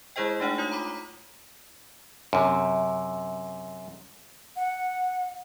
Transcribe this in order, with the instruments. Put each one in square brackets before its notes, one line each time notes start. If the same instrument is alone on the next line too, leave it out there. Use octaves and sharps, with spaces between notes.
[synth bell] G#3 E4 G#4 C5 D#5 G5
A3 D4 D#4 F#5
F4 C#5 D#6
A#5 B5 D6 B6
[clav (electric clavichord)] F#2 C3
[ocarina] F#5